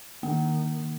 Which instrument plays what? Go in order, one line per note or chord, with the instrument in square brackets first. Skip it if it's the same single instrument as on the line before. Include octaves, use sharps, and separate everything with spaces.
[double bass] D#3 [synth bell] A#3